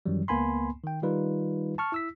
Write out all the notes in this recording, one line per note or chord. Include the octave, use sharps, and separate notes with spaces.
F#2 D#3 E3 F#3 G3
C#2 A#3 B3 G#5 B5 C6
D#3 G5
D#3 G3 D#4 F4 B4
A5 C#6 F6
E4 E6 B6